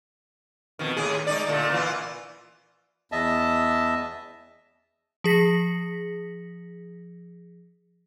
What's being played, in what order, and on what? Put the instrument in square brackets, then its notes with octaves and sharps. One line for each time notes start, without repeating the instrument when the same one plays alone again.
[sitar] F2 B2 D#3
D#2 A2 G#4
G#3 D#4 D5
A#2 D3 A3
A#2 E3 F4
[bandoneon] E2 D#5 E5 A5
[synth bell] F3 G#4 A#6 B6 C#7